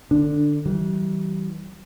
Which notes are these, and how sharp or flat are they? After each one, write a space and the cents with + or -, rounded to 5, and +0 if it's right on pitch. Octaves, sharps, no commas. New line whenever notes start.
D3 +20 D4 +0
E3 -25 G3 -40